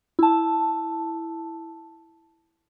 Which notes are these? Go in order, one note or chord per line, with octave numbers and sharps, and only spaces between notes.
E4 A5